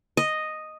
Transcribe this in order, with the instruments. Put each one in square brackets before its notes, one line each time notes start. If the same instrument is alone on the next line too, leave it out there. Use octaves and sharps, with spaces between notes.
[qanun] D#5